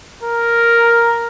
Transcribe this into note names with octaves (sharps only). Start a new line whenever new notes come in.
A#4